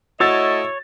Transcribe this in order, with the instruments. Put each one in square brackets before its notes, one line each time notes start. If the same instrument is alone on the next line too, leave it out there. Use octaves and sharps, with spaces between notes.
[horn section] A3 E4 D#5 [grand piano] F#4 E6 A6 [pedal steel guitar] C#5